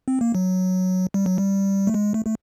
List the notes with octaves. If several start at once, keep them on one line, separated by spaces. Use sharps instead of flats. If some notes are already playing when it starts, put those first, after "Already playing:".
C4
A#3
F#3
G3
F#3
G3
A3
G#3
A3
A3